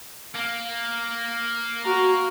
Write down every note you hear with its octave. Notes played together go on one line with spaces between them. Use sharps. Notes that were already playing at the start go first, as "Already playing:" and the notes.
A#3
F#4 A#5